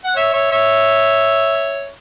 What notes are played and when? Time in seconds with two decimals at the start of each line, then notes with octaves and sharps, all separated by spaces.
0.04 F#5
0.15 C#5 E5
0.33 C#5 E5
0.52 C#5 E5